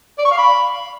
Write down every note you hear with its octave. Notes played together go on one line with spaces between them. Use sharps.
D5
C#6
F5
B5